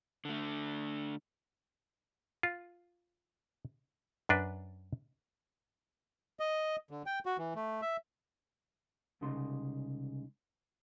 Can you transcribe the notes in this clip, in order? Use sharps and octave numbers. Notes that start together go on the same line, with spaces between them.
D3 A3
F4
F#2 D4 B4
D#5
D3
G5
F#4
E3
A3
E5
C2 C#3 G#3 D#4 C6